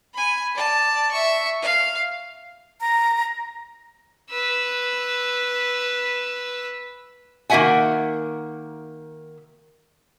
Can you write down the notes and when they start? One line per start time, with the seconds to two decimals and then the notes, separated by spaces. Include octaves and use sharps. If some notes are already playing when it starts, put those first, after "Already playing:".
0.14 G#5 B5
0.55 D5 A5
1.11 E5 C#6
1.62 F5
2.81 A#5
4.30 B4 E6
7.50 D#3 A#3 F#4 E5 F#5 G#5